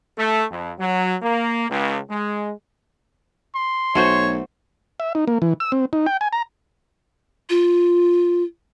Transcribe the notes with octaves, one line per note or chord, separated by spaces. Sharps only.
A3
F2
F#3
A#3
C#2
G#3
C6
B1 A3 F#4 C5 C#5
E5
D#4
A#3
E3
E6
C4
D#4
G5
G#5
A#5
F4